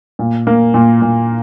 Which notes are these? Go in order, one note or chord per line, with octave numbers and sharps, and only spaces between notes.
A#2
A#3
A#2
A#2